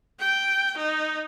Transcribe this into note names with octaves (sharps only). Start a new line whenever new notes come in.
G5
D#4